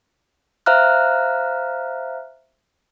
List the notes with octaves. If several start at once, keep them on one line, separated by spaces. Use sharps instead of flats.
C5 E5 F5 A#5 F6 F#6